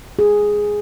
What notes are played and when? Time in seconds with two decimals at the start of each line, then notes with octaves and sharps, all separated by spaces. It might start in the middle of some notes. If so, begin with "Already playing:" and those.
0.19 G#4